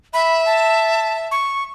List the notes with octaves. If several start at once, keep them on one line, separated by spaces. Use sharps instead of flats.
E5 B5
A5
C#6